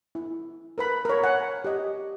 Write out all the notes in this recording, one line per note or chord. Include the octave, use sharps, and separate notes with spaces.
E4
A#4 B4 B5
A#4 C#5
F#5 G#5
G4 D#5